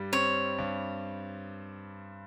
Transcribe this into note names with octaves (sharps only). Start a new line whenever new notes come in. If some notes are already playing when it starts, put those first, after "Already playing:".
Already playing: G2 G3
C4 C#5
G2